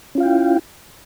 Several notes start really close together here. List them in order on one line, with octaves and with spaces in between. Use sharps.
C#4 F4 F5 G5 E4